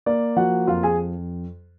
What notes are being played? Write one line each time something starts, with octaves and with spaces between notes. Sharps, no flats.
A#3 D5
F3 F#4 F#5
F2 F4 F5
G#4 G#5